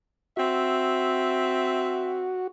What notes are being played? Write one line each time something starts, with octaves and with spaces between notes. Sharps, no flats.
C4 F#4 E5